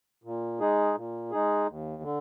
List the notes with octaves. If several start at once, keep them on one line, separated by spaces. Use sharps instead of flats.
A#2
G#3 D#4 G#4
A#2
G#3 D#4 G#4
D#2
D3